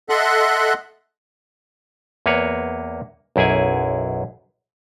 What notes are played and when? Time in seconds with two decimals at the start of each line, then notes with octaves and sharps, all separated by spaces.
0.09 A4 D#5 E5 F#5 C6 F#6
2.26 E2 A#3 B4 C#5
3.36 B1 F#2 E4 G#4 G#5